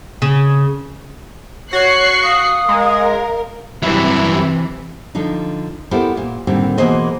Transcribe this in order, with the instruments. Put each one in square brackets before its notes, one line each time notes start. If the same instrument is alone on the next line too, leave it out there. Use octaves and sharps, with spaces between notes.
[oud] C#3
[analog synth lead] F#4 [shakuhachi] C#5 [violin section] C#6 F#6 C7
[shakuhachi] F5 [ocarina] D#6
[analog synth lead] G#3 [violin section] A#4
[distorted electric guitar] G2 F#3 [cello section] C3 E3 [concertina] E4 E5
[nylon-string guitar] D3 F3 D4 D#4
B3 E4 G4 A4 A#4 C5
A#2
A2 D3 D#3 G3 A#3 C4
B2 E3 A#3 G#4 C5 D#5